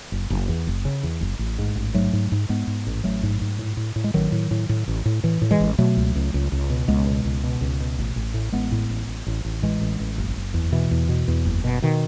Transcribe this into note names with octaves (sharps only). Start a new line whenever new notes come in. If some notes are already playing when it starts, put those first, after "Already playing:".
F#1
F#1
E2
F#1
C#3
E2
F#1
A1
G#2
A1
G#2 F#3 A3
G#2
G#2
G#2 G#3 B3
G#2
A1
A1 F#3 A3
G#2
G#2
A2
A2
A2
G#3
A1 D#3 F#3
A2
A2
A2
A1
A2
A2 E3
A2
E3 G#3
A1
B2 F#3 A3
C#2
C#2
C#2
C#2
B2
C#2 G#3 B3
B2
C#2
B2
C#2
B2
A1
A1
A2
A1 G#3 B3
A2
A1
A1
A1
A1
A2 E3 G#3
A1
A1
F#1
F#1
E2
B2 E3
E2
B2
E2
F#1
B2
B2 D#3